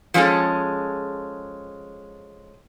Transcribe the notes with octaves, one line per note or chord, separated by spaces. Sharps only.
F3 G#3 C#4 G#4 A4